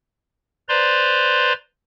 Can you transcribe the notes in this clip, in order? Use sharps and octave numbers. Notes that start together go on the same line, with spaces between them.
B4 C5 D5 A#5 C6